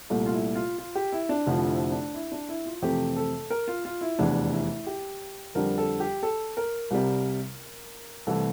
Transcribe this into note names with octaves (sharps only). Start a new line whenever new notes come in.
C2 A#2 A3
F4
E4
F4
F4
G4
E4
D4
F1 F2 D3 F3 E4
E4
D4
E4
D4
E4
F4
F2 C3 E3 A3 G4
A4
A#4
F4
F4
E4
F1 E2 E3 D4
E4
G4
F2 D3 G3 A#4
A4
G4
A4
A#4
C2 C3 G3
C2 C3 E3 A3 A4